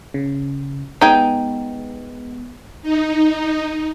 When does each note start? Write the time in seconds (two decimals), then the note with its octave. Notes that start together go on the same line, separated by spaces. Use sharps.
0.14 C#3
1.01 G#3 B3 D#4 G5 G#5
2.82 D#4